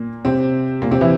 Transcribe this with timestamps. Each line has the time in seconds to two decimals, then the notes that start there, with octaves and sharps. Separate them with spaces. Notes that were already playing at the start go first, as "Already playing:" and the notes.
Already playing: A#2 A#3
0.25 C3 C4
0.82 A#2 A#3
0.91 C3 C4
1.01 E3 E4